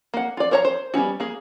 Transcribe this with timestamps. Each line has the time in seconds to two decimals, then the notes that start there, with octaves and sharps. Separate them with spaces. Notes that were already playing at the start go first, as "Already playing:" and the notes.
0.14 A#3 F#5
0.37 F4 D5
0.51 A#4 C5 C#5 A5 A#5
0.65 C5
0.94 G3 B3 C#4 F#4
1.20 A#3 G#4